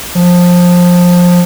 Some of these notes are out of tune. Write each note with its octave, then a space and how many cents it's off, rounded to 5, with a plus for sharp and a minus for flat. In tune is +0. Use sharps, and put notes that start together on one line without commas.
F3 +20